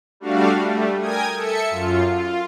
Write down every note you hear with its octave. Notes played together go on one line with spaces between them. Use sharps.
G3 A3 D4 F#4 F5
G3 A3
A#4 G5 G#5 D#6 G#6
A4 E5 C#7
F#2 F4
F4